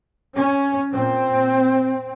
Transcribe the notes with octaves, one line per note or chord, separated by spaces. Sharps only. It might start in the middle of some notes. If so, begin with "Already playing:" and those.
C#4
A#2 C4